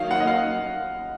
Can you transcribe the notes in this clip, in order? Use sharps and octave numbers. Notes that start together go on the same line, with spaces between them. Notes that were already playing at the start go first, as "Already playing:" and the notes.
Already playing: D#3 F#3 A#3 D#4 F5
F#5
D#5
F5